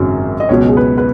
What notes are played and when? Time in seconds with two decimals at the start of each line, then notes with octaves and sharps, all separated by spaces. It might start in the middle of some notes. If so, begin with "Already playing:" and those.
Already playing: G#1 F#2 C#3 F#3
0.40 D#5
0.49 C#2 B2 F#3 C#5
0.68 G#4
0.77 B4
0.98 B4